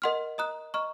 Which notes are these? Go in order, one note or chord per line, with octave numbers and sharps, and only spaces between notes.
A#4 D#5 F#5 C6 F6
D#5 A#5 D#6 F#6
D#5 A#5 C#6 F6